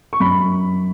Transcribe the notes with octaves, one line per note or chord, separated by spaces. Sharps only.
C#6
F#2 B5